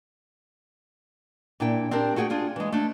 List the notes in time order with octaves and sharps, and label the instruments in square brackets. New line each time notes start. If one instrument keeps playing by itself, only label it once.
[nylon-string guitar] A#2 D4 E4 G5
C4 D4 G4 A#4
A3 F#4 G#4 F#5 G5
D4 F4 G#4
E3 G#3
A3 D4